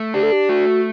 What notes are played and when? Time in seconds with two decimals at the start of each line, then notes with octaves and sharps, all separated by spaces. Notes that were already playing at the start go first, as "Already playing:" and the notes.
Already playing: A3
0.14 D4 G4
0.23 A4
0.32 G4
0.49 A3 F#4